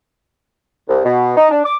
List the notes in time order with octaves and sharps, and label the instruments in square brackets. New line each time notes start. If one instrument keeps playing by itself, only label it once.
[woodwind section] C2
B2
D#4
D4
D6